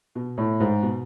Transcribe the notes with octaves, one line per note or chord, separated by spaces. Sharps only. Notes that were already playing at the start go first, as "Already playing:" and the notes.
B2
A2
G#2
B2